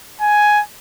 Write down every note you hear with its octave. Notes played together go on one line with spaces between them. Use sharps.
G#5